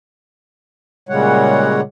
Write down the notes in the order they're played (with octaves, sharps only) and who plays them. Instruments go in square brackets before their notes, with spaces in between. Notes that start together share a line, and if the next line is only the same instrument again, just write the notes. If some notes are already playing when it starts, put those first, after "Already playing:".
[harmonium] A#2 C#3 G3 G#3 C#5 F#5